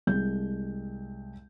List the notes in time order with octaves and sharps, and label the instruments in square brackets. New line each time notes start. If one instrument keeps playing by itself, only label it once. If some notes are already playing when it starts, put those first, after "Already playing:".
[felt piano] C2 G#3 G6